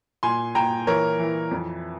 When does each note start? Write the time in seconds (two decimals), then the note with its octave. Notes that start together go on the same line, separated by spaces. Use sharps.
0.23 A#2 G#5 C6
0.55 A#2 G5 A#5
0.87 E3 A#4 C#5
1.19 E3
1.51 F2